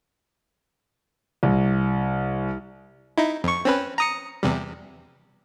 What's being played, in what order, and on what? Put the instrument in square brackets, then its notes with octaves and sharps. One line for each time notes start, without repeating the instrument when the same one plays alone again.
[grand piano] C2
[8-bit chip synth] D#4 E4
F2 C#6
C4 C#4 B4
A#5 D#6 C#7
E2 C3 G3